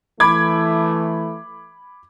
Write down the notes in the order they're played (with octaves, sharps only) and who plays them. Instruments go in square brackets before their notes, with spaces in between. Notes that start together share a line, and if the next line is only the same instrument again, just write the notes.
[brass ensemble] E3 A3 [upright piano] B5 D6 G#6